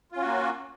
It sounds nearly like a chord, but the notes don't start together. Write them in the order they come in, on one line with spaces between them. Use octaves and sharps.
F4 C#4 F#4 A#3